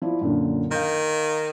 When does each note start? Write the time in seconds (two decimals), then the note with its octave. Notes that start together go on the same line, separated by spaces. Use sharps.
0.02 F3 E4 D5
0.21 F#2 A#2 D3
0.71 D#3 F5 G6